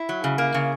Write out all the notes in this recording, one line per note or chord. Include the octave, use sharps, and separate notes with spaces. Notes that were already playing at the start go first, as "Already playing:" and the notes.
Already playing: E4
F#3
C#3
A#3
C#3